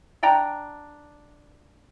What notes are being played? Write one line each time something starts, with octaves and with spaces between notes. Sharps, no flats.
D4 D5 G5 A#5